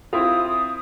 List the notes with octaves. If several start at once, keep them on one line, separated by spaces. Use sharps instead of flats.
C4 E4 F4 D#6